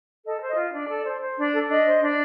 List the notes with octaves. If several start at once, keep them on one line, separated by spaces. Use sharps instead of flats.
A4 D#5
C5
D#5
F4
D4 D5
A4
C5
C5
D4
A4
D4 D#5
C5
D4